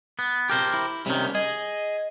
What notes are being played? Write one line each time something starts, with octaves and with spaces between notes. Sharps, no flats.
B3
G4 A#4 C5
E4
C3 D#3 G3 C#4
G#4 D#5